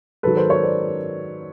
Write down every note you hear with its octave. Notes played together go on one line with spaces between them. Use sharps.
G#2 D#3 F#3 A4 B4
A#4 C5
B4 C#5
C5 D5